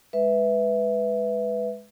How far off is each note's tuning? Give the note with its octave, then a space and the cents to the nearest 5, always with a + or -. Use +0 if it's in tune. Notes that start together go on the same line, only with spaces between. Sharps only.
G#3 +0 B4 +0 E5 +0